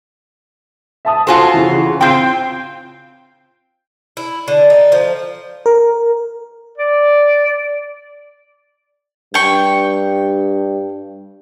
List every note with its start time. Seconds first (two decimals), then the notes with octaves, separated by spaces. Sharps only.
1.05 E5 A5 D#6
1.27 F4 F#4 A4 C5 G#5 A5
1.54 C#3 E3
2.01 C4 F4 G5 G6 D7
4.17 E4
4.48 D3
4.70 D#4
4.92 F3
5.66 A#4
6.78 D5
9.34 G2 G5 C#6